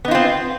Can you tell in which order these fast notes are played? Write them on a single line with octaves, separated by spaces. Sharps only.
B3 D#4 F4 C4